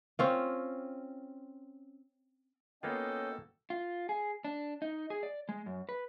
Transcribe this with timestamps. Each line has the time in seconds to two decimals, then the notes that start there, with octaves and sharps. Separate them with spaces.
0.19 C4 C#4 F4
2.83 A#3 B3 C#4 F4 F#4 A4 D#5 G5
3.70 F4
4.09 G#4
4.45 D4
4.82 D#4
5.10 G#4
5.23 D5
5.49 G#3
5.66 F#2
5.89 B4